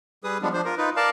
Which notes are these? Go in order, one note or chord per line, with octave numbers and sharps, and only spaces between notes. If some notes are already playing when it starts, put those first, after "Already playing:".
G3 G#4 B4 D#6
F3 G3 G#3 B3 D4
F3 D4 C5
F4 A#4
D#4 F4 B4
A#4 D5 F5 A5